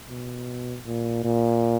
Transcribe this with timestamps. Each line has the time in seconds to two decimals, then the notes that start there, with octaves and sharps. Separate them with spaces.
0.09 B2
0.86 A#2
1.24 A#2